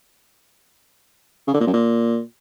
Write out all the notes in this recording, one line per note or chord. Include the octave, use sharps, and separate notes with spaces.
C#3
D3
A#2
F#2
A#2